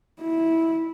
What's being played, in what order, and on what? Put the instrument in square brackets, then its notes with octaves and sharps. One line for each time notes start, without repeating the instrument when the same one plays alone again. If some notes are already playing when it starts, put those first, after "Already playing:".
[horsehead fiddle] E4